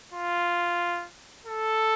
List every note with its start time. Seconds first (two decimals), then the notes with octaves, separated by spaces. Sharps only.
0.13 F4
1.46 A4